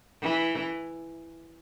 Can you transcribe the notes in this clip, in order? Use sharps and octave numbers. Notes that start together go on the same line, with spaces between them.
E3